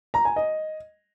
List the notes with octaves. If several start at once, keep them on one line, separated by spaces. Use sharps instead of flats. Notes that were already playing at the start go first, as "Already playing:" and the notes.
A#5
G#5
D#5